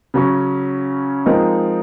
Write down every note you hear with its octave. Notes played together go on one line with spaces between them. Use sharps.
C#3 F#3 C#4
F3 G#3 C4 D#4 A#4